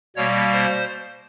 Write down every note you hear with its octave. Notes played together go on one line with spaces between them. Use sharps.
B2 G3 A#3 C#5
C5